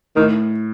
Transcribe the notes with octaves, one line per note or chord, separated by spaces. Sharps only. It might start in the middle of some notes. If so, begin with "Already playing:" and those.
A2 D#3